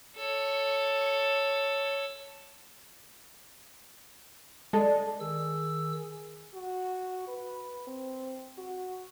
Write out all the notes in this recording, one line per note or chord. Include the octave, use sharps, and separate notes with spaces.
A4 C#5
G#3 D4 A4
D#3 G#4 E6
F#4
B4
C4
F#4